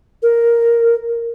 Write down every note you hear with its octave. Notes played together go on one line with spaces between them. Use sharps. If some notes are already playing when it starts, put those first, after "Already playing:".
A#4